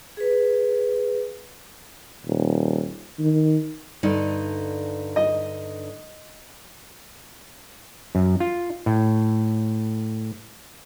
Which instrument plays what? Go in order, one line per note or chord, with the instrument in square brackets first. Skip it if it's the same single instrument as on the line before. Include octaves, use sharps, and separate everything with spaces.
[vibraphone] G#4 B4
[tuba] D#1
D#3
[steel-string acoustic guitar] G2 D3 D#4
[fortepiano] D#5
[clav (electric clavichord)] F#2
F4
A2